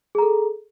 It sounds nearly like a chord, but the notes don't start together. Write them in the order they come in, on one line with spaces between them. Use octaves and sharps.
G#4 A#5 A4